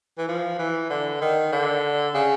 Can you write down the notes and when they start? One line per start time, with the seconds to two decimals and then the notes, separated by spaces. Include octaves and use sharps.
0.18 E3
0.28 F3
0.59 E3
0.90 D3
1.21 D#3
1.53 D3
2.14 C#3